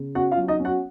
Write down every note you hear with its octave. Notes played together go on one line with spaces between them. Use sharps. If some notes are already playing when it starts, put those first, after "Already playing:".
Already playing: C#3
C#4 F#4 F#5
F4 F5
F#3
D#4 D#5
C#4
F#4 F#5